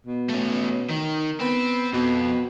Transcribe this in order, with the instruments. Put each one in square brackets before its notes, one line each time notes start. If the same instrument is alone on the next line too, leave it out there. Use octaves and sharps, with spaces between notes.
[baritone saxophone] B2
[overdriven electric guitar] A3 C#4
D#3
[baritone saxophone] B3 [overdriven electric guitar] C4
[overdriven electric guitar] F2 [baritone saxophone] B2